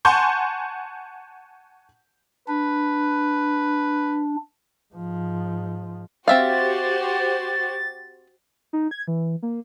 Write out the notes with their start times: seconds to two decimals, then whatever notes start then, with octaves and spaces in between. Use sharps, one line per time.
0.05 F#5 G#5 A5 C6 C#6 G6
2.48 D4 B4
4.94 G#2 F3
6.28 C4 F#4 G4 C5 E5 F5 A6
8.73 D#4
8.91 G#6
9.08 E3
9.43 A#3